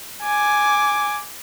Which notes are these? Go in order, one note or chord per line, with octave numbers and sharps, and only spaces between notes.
G#5 D6